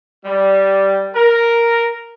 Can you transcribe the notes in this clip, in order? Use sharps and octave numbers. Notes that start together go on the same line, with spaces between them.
G3
A#4